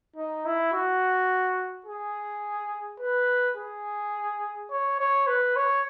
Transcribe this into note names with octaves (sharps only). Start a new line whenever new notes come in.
D#4
E4
F#4
G#4
B4
G#4
C#5
C#5
B4
C#5